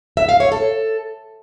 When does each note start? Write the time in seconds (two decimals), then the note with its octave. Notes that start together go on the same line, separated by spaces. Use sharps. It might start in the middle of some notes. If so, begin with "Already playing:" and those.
0.17 E5
0.29 F5
0.40 C#5
0.52 A4